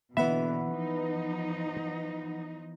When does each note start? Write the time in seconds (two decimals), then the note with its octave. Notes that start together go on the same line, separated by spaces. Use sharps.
0.17 B2 D3 E3 B3 B4 E5 F#5 B5
0.71 F3 D#4